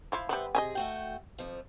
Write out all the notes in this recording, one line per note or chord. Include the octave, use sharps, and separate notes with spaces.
F3 E4 F4
G3 B3 B4 C5 E5
C3 G#4 D#5 E5 G#5
A3 F#4 G5
F2 F3